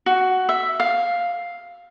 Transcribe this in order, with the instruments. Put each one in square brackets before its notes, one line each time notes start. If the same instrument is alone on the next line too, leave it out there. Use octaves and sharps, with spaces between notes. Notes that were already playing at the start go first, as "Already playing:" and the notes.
[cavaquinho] F#4
E5
F5